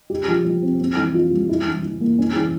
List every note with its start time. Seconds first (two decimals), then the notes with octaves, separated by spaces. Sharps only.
0.10 G4
0.28 F3
0.45 F3
0.62 C4
0.80 C4
0.97 E3
1.14 F4
1.31 G3
1.49 E4
1.66 E3
1.83 E3
2.01 A#3
2.18 C#4
2.36 E3